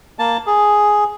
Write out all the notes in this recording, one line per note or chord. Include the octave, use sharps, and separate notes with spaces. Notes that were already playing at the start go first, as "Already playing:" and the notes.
A#3 A5
G#4